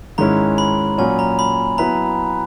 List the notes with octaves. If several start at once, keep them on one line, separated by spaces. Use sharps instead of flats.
G#2 D#3 G#3 C#4 E4 A#5
B5
A#2 F#3 C#4 G#5
A#5
B5
F#3 B3 E4 B4 E5 A#5